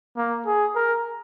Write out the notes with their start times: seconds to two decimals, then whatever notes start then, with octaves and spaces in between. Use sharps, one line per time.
0.17 A#3
0.46 G#4
0.75 A#4